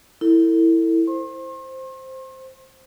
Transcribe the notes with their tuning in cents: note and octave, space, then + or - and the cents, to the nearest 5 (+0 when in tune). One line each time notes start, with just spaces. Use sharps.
E4 +0 A4 +35
C5 +0 C6 +45